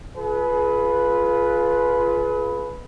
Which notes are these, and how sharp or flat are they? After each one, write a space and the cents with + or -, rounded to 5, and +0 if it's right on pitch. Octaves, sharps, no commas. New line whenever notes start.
F4 +0 G#4 +40 B4 +0